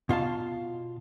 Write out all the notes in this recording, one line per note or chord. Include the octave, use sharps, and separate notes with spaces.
B2 F4 F5 A5